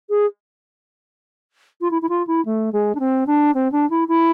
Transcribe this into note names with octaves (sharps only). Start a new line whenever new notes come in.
G#4
F4
E4
E4
F4
E4
A3
G#3
D4
C4
D4
C4
D4
E4
E4